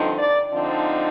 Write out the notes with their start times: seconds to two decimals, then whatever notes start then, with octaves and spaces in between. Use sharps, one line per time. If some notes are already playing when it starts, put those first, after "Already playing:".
Already playing: G2 D3 F3 C4 D#4
0.18 D5
0.52 D3 F3 C4 D#4